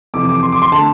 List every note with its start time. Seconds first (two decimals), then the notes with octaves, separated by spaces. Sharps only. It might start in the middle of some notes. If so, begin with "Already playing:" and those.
0.14 F2 C3 E3 D6
0.29 D6
0.43 C6
0.52 D6
0.62 C6
0.72 D3 A3 A5